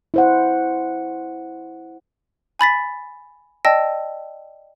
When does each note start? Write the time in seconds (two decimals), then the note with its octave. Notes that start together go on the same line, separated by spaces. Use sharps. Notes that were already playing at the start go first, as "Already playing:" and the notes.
0.14 E4 C5 F#5
2.59 G#5 B5 A6 B6
3.65 D5 D#5 G5 A5 E6 A#6